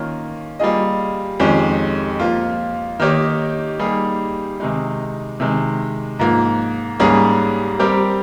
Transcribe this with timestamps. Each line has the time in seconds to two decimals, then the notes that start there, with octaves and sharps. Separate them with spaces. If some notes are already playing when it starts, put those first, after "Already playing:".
Already playing: D#3 A#3 C#4 F4 A#4
0.60 G3 A#3 F4 G#4 D#5
1.40 F2 D#3 G#3 C#4 G4
2.20 F3 A#3 F4
3.00 D#3 A#3 D#4 G4 C#5
3.79 G3 A#3 D#4 G#4
4.60 C3 D#3 G#3 D#4
5.40 C3 D#3 G#3
6.19 G#2 F3 A#3
7.00 G#2 G3 A#3 C#4 G#4
7.79 G3 C4 G4 A#4